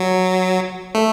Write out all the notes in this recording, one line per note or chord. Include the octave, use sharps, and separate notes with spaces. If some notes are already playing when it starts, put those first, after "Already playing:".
Already playing: F#3
A3